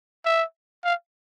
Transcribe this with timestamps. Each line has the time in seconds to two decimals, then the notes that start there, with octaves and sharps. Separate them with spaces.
0.25 E5
0.85 F5